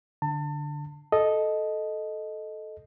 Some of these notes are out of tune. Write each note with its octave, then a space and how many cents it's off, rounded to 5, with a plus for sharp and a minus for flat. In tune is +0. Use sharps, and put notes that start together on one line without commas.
D3 +0 A5 +30
A4 -10 D#5 +0